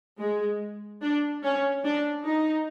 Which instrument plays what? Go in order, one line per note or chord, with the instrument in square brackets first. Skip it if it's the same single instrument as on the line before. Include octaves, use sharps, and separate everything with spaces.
[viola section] G#3
D4
C#4
D4
D#4